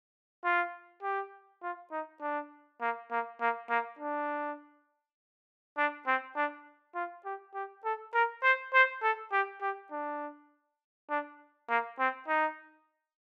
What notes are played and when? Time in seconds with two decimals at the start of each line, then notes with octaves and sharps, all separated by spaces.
0.45 F4
1.03 G4
1.63 F4
1.92 D#4
2.21 D4
2.81 A#3
3.11 A#3
3.41 A#3
3.70 A#3
3.99 D4
5.78 D4
6.07 C4
6.36 D4
6.95 F4
7.25 G4
7.54 G4
7.85 A4
8.14 A#4
8.43 C5
8.74 C5
9.03 A4
9.32 G4
9.62 G4
9.92 D4
11.10 D4
11.69 A#3
11.99 C4
12.28 D#4